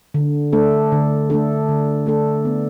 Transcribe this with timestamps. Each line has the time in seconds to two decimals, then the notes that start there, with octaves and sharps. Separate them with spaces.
0.14 D3
0.53 A3 D4 A4
0.92 D3
1.30 A3 D4 A4
1.68 D3
2.06 A3 D4 A4
2.45 B3